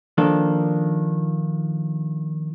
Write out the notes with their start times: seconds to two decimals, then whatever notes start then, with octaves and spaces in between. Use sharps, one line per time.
0.18 D#3 F3 A#3 D4 A4